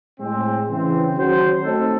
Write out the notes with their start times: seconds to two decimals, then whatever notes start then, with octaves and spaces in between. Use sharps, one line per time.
0.20 A2 G#3 C4
0.68 C#3 E3 C4
1.15 D#3 F#3 C#4 F#4 C5
1.63 A3 C4 D#4 A4